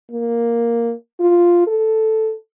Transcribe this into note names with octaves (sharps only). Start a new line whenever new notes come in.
A#3
F4
A4